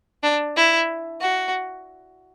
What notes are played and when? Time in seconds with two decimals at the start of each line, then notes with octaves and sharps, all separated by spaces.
0.23 D4
0.56 E4
1.21 F#4